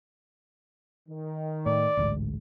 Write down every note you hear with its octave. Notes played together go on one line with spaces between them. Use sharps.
D#3
A2 D5
A1 D2 G#2